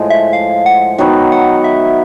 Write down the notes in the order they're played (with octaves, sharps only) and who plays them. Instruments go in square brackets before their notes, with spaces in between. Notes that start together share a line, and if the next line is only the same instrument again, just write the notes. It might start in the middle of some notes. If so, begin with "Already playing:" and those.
Already playing: [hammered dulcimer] A2 F3 G#3
[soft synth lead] E5
F5
F#5
[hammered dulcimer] D#3 F#3 B3 D#4
[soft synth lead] F#5
E5